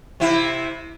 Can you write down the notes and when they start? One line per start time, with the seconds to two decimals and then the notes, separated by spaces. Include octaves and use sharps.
0.20 C3 E4